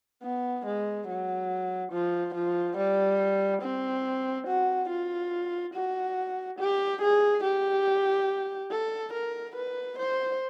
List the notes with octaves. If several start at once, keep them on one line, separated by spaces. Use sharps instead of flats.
B3
G#3
F#3
F3
F3
G3
C4
F#4
F4
F#4
G4
G#4
G4
A4
A#4
B4
C5